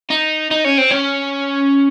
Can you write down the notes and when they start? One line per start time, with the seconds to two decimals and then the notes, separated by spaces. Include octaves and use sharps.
0.10 D#4
0.51 D#4
0.64 C#4
0.78 C4
0.91 C#4